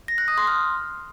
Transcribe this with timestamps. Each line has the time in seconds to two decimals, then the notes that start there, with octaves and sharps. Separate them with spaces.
0.08 A#6
0.18 F#6
0.28 D#6
0.38 C6
0.47 F6